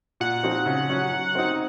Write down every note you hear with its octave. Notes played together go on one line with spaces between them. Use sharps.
A#2 F#5
F3 C4 D#4 F#4
C#3
F#3 C#4
F#3
C4 D#4